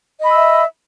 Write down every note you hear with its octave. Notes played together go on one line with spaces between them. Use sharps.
D#5 E5 B5 E6